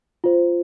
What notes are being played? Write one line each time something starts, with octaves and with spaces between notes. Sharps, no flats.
F4 C5